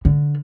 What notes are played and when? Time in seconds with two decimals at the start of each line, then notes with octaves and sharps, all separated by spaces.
0.05 D3